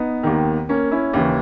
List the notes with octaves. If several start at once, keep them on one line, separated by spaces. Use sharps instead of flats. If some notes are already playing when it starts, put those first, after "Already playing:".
Already playing: B3 D#4
D#2 D#3
A#3 C#4
C#4 E4
D#2 C#3 E3